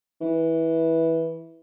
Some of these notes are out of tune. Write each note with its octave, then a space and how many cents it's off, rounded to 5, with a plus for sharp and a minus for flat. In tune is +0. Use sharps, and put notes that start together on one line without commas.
E3 -15